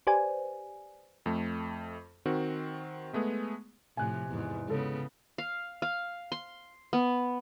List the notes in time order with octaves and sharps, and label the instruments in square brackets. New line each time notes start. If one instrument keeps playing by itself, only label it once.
[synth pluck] G4 B4 C5 D5 G#5
[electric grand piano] F2 A3
D#3 C4 F#4
G#3 A3 B3 G#4
[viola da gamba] A2 C3 F3 [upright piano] G#5 F#6
[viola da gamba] E2 G#2
[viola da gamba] C#3 B3 [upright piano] G#3 A4 C#5
[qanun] F5
F5
C6
B3